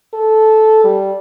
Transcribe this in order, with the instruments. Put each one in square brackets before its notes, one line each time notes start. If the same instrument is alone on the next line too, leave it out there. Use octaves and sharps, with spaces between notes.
[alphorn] A4
G3